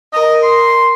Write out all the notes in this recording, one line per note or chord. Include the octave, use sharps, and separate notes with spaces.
A#4 D#5
C6